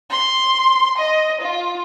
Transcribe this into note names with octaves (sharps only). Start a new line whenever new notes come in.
C6
D#5
F4